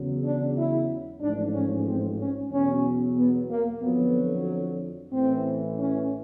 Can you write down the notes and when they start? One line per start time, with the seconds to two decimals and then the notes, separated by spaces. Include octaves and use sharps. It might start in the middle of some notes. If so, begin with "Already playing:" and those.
Already playing: E2 C#3 F#3
0.24 D4
0.56 E4
1.21 A1 G#2 F3 D4
1.54 C#4
1.86 C4
2.19 C#4
2.52 E2 B2 F#3 C#4
3.17 B3
3.49 A#3
3.82 F2 D3 F#3 B3
5.12 A1 A2 E3 C4
5.78 C#4